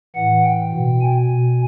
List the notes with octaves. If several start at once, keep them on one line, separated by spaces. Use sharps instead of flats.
A2 E3 F#5
G5
B2
G#5
B2